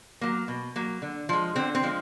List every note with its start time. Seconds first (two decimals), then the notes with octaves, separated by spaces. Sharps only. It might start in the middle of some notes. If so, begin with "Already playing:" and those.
0.21 F#3 A#3
0.48 B2
0.76 F#3 A#3
1.02 D3
1.29 F3 G#3
1.56 D3 C4
1.75 C4
1.83 F3 G#3